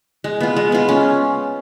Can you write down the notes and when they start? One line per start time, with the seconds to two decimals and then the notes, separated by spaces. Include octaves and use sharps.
0.24 G#3
0.41 B3 F4
0.57 G#3
0.72 B3 F4
0.89 C#4